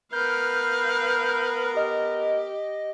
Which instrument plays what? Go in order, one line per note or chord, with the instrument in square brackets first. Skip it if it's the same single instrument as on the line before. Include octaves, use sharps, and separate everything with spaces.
[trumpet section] B3 A#4 [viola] B4 F5 [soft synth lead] G6
[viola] G4 [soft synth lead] D#5